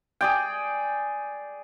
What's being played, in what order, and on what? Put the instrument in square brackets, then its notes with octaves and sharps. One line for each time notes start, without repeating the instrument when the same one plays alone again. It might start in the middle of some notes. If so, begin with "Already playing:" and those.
[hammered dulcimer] G#4 D5 G5